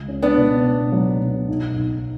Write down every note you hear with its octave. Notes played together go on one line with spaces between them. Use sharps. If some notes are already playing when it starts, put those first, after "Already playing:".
Already playing: C#2
C#4
B3 D4
B2
B2
F#3
B2
B1
B1